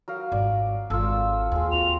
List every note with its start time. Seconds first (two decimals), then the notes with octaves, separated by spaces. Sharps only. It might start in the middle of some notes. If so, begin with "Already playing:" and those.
0.08 F#3 A#4 F5
0.32 G#1 D5
0.90 G#1 F4 A4 E6
1.52 D#2 C4 F4 G#4
1.72 F#4 G5 C6 F7